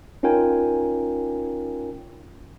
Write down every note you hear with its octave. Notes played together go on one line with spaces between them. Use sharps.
C#4 D#4 F4 A#4 G5 G#5